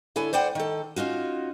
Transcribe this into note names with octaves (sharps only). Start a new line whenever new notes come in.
D3 E4 A4 C#5 G#5
C5 D5 F#5 G5
D#3 A4
C#4 D#4 F4 F#4